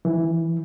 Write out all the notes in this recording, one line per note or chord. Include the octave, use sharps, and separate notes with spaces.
E3